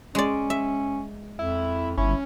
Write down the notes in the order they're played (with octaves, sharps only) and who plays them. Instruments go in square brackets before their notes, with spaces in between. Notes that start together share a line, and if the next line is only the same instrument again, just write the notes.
[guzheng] G#3 D5 [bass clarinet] C#4
[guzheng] E5
[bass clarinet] F2 [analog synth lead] E4
[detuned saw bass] G1 [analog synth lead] C#4 [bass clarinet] E4